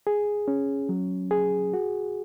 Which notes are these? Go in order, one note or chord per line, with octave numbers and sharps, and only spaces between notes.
G#4
C#4
F#3
G#4
F#4